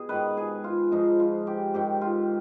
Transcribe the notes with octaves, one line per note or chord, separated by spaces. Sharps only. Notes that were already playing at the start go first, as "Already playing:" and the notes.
Already playing: B2 G#4
G#2 D#3 B4
G#4
F4
G#2 F3 D#4
F4
G4
G#2 D#3 G4
F4